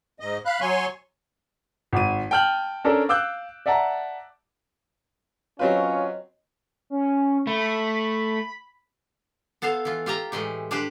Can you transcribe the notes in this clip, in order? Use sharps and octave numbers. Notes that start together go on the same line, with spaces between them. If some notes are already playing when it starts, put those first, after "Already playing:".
G#2 D#5
F5 B5 F#6
F#3 C#5 G#5 C6 C#6
G#1 D#7
G5 A5 F6 G6 F#7
C#4 D4 A4 A#4
F5 D6 E6 F#6 G6
D5 E5 F#5 A5 A#5
F#3 C4 C#4 F4 B4 C#5 D#5
C#4
A3 B5
B3 A4 C5 F5
E3 F4
F4 G4 G5 A#5
A2 E3 G#3 G4
D4 G4 B4 C5